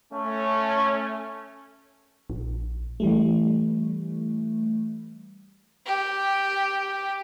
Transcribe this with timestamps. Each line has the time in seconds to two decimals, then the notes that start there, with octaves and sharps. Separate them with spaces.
0.12 A3 C#4
2.30 A#1
3.00 E3 G3 A3
5.86 G4